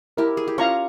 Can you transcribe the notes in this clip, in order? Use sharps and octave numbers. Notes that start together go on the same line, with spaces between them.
E4 G4 A#4
G#4
G4
C#4 F4 F5 A#5 C#6